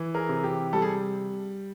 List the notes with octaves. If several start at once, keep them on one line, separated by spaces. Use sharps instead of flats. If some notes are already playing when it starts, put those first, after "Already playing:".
Already playing: E3
G#4 A#4
C3
G4
G3 A4
G#4